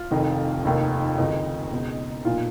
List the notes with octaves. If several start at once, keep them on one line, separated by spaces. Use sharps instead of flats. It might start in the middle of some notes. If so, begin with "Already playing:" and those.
Already playing: F4
F1 F2 D#3
F1 D#2 D#3
F#1 F2 D#3 D#4
C#2 B2
B1 A#2 F4